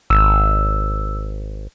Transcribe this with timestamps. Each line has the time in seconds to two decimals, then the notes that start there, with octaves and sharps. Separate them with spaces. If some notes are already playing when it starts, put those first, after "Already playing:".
0.10 G#1 E6